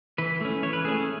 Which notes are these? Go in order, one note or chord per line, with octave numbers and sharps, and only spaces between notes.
E3 B4
A3 C#4
E3 C#5
B4
A3 C#4 G#4